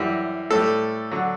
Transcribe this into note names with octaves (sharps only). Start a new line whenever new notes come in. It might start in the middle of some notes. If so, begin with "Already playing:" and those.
Already playing: F#2 E3 G3
A2 G3 A4
D3 F#3